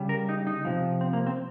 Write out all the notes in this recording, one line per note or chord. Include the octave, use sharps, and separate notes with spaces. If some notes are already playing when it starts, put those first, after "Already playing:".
Already playing: C#3 G3
A#4
D#4
D#4
C3 F3
C4
A#3
C4